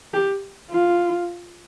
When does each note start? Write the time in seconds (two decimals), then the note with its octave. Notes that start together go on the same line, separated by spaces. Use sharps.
0.14 G4
0.71 F4